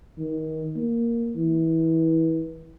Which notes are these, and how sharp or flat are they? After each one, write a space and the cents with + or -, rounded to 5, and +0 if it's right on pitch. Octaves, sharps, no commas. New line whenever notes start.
D#3 +25
A#3 +0
E3 -25